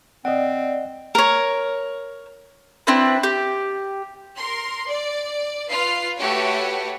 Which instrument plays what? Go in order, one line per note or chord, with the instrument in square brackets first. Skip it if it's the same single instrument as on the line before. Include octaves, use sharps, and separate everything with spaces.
[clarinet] C4 [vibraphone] D5 [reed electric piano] D#5 F#5
[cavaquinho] A#4 C#5
[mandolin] C4 D4 E4 B4
G4
[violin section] A#4 C6
D5
F4 B4 F5 C7
A3 F#4 G4 B4 C#5